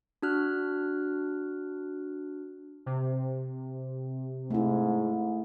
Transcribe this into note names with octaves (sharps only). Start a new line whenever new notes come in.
D4 F#4 F6 F#6
C3
G#2 A3 E4